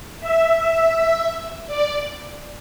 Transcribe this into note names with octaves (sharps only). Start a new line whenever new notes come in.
E5
D5